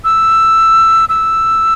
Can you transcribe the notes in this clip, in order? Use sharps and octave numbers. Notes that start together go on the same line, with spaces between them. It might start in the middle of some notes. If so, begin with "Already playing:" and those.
E6
E6